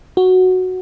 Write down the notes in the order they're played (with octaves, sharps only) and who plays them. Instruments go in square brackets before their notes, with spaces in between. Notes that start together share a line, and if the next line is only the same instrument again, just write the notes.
[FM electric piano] F#4